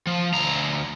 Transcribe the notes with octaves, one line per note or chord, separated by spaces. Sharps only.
F3
D2 A#5